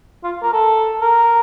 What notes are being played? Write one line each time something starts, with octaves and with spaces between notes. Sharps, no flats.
F4
A#4
A4
A#4